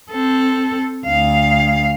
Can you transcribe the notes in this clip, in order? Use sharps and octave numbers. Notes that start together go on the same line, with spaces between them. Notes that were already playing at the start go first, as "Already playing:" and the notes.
C4 A4
D2 F5